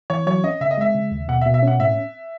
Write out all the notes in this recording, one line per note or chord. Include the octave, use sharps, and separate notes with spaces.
E3 C#5
F#3 C#5
C#4 D#5
C#3 E5
D#5
G#3 E5
C#3
D#2
B2 F#5
E5
B2
E5
C#4 F#5
A2 E5